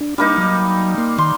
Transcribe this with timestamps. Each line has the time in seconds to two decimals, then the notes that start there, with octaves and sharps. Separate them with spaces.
0.01 D4
0.18 G3 A#3 D4 D#4
0.38 F#3
0.98 A#3 C6
1.18 D#3 C6